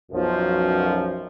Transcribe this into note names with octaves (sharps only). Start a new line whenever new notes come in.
B1 F#2 F3